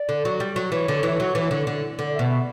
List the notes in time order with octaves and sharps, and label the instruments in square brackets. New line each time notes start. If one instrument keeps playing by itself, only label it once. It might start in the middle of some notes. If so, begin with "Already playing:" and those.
Already playing: [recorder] D5
[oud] D3
F#3
G3
F#3
[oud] E3 [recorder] C#5
[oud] D3
E3
F#3
E3
D3
D3
D3
[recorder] D5
E5
[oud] B2
[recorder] E5